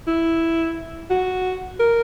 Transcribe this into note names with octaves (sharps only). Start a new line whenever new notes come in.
E4
F#4
A#4